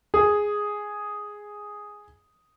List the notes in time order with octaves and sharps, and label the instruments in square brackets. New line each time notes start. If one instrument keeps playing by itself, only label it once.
[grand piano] G#4